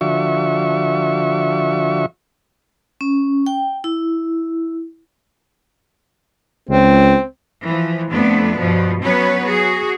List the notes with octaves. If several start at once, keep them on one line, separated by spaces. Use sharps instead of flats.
D3 F3 F#4 E5 C#6
C#4
G5
E4
C#2 C4
E3 F3
F2 D3 A3 B3 D4
G2 B2 F3
F#3 B3 C#4 B4 C#5
F#4 G#4